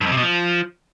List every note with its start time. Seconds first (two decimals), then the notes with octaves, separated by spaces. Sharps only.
0.01 G2
0.06 F2
0.12 C3
0.17 B2
0.22 F3